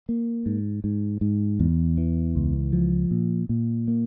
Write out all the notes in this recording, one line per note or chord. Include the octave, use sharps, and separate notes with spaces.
A#3
G#2
G#2
G#2
E2
E3
C#2
F3
A#2
A#2
A#3